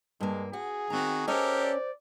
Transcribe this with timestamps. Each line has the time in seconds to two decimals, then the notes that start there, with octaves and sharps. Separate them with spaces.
0.20 G2 G#3 A#3
0.53 F#4 G#4
0.90 D#3 C4 F#4 A#5
1.28 C#4 G4 A4 A#4 C5 C#5 D#5
1.62 D5